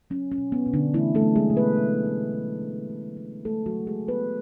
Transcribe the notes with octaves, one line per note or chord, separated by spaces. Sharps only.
F#3 C#4
C#4
B2
B3
B2
D3 D4
E3 A3 E4
A3 A4
F#3
G#3 G#4
B2
B3 B4
B2
A3
F#3
B2
B2
A3
G#3 A3 A4
F#3 F#4
C#3
G#3 G#4
G#3
B3 B4